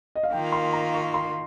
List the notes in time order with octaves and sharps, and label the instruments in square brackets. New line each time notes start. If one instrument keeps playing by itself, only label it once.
[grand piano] D#5
F5
[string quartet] D#3 A#3 F4 [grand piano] G5
[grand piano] C6
A#5
C#6
C6